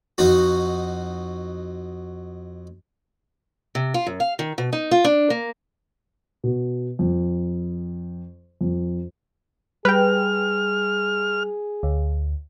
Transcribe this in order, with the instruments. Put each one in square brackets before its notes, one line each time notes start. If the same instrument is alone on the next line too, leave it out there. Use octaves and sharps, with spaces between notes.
[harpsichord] F2 D#4 F#4
[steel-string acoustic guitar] C3
F4
F#2
F5
D#3
B2
D#4
F4
D4
A#3
[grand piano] B2
F2
F2
[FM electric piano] G3 [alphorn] G#4 [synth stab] B4 G5 [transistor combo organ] F6
[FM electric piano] D2